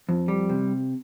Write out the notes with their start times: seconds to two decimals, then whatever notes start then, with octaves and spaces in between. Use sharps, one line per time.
0.09 F2
0.28 G3
0.49 C3